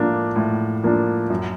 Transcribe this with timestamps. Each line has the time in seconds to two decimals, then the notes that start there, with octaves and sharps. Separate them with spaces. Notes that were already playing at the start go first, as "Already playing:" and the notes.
Already playing: A2 F3 A#3 D4
0.36 A2
0.84 F3 A#3 D4
1.30 F#2